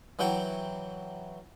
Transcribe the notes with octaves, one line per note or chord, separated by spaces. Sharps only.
E3 F#3 E4 F#5 G5